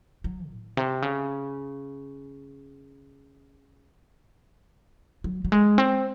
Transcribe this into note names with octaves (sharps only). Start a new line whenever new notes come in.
F#3
A2
C3
C#3
F#3
F#3
G#3
C4